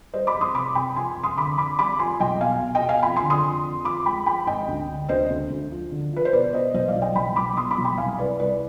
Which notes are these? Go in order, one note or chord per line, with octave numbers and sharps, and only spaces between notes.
G3 C5 D#5
B5 D6
F2
C6 D#6
C3 B5 D6
C3 G5 B5
F2 G#5 C6
F1
C6 D#6
D3 B5 D6
F2 B5 D6
G3 B5 D6
F2 G#5 C6
B1 D#5 G5
B2 F5 G#5
B2
D#5 G5
B2
F5 G#5
F2 G5 B5
G#5 C6
D3
C6 D#6
F2
F2
F3 B5 D6
G#3 G5 B5
F3 G5 B5
G#1 D#5 G5
D2
D3
D2 C5 D#5
D2
D2
F3
D3
F3 B4
C5
B2 B4 D5
B2 C5 D#5
B1 C5 D#5
D5 F5
B1
D#5 G5
B1 G5 B5
B1 B5 D6
B2 C6 D#6
B5 D6
B1
G5 B5
C2 F5 G#5
C2 B4 D5
C2 B4 D5